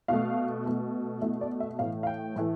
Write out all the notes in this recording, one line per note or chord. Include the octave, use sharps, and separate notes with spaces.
B2 A3 F5
B2 A3
B2 A3 E5
D5
E5
A2 E3 A3 F5
F5
G5
A2 E3 A3